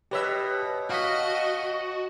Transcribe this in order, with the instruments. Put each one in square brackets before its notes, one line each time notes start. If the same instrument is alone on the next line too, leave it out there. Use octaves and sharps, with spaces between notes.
[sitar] B2 C#5 E5 [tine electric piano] G4 B4 B5
[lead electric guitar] F#4 [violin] D#5 [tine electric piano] F5 B6